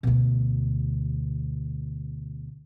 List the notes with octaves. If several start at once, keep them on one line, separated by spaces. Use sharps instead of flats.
D2 B2